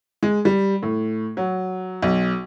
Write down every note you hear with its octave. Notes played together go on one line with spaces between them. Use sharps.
G#3
G3
A2
F#3
B1